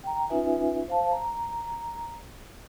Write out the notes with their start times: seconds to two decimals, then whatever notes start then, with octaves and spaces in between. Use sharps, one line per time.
0.04 G5 A#5
0.29 C#4 D#4 F4 B4 E5 G#5
0.88 C5 F5 A5
1.12 A#5